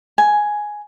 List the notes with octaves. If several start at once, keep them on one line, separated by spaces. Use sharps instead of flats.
G#5